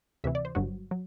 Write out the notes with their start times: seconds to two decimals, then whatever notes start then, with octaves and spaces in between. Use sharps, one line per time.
0.24 D2 C3 E3 E5
0.35 D5
0.45 C5
0.55 G1 G2 F#3 F#4
0.91 F#3